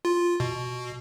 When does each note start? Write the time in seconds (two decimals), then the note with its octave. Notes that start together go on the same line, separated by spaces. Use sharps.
0.05 F4
0.40 B2